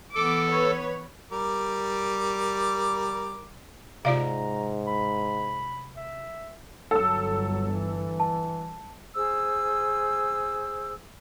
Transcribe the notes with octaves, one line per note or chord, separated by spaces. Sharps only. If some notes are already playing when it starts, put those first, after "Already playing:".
E3 B3 A4 D6
B4 C#5
G3 A#4 D6
G#2 C3 F4 D5 F5 A#5
B5
E5
G1 F#3 A4 E6
E3
A5
G#4 C5 E6